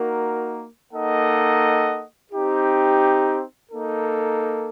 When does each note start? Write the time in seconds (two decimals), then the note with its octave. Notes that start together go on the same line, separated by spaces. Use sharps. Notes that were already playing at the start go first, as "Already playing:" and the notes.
Already playing: A#3 D#4 F#4 A#4
0.93 A#3 D#4 A4 D#5 F#5
2.32 C4 D#4 G4
3.71 A#3 D#4 A4